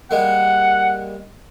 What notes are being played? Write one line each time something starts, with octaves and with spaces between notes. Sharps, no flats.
G3 G#3 A#3 F#5